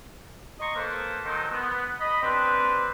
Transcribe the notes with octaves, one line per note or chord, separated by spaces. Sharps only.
D#5 A#5 C6 C#6
A#3 A4 B4 C5
D#3 F#3 D#4 A4 C5
B3
D#5 B5
C4 D4 G4 B4